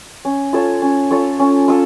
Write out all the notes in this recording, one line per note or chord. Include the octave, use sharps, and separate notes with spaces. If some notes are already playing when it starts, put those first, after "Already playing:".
C#4
F4 A4 C#5
C#4
F4 A4 C#5
C#4
F4 A4